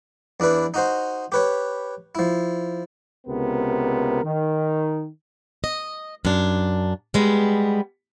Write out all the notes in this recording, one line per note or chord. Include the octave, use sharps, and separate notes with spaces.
E2 D4 E4 B4
D#4 F#4 C5
G4 B4 C#5
F3 E4
C#2 C3 B3 A#4
D#3
D#5
F#2 D4
G3 G#3 B3